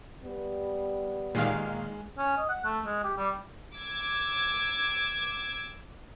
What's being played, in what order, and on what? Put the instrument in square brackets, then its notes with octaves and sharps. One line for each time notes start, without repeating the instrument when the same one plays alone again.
[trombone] G3 [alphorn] B3
[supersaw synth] A#2 D#3 F5 [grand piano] G#3
[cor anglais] C#4
D#5
F#5
A3
G#3
G4
G3
[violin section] D6 E6 G#6